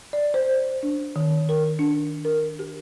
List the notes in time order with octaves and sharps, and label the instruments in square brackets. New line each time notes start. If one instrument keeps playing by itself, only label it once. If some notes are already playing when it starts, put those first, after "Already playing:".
[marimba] D5
C5
D4
D#3
A#4
D4
A#4
G4